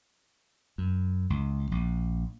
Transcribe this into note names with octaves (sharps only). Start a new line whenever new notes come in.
F#2
C#2
A#1